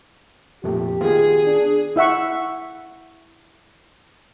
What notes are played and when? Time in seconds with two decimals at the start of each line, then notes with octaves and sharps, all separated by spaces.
0.64 F2 A#2 A3 G4
1.01 D#3 B3 F4 G#4
1.44 D4
1.96 E4 E5 F#5 C#6